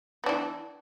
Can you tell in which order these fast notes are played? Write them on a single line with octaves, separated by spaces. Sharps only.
B3 D4 E3